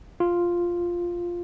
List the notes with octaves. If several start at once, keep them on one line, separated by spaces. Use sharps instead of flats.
F4